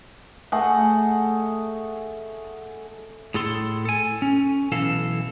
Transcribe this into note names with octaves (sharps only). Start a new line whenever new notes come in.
A3 G#4 D#5 F#5
A2 G#4 A4 C6
A4 G#5
C#4
B1 E3 A4 F5